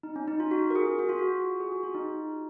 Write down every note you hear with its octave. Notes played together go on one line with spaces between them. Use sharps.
D#4
C#4
D#4
F4
F#4
A#4
G#4
F#4
F4
F#4
G#4
F#4
F4
D#4